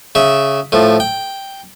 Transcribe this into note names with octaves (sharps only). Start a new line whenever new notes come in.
C#3 E5
A2 F3
G5